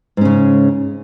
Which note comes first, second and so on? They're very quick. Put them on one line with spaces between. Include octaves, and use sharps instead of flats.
G#2 C#4 C#3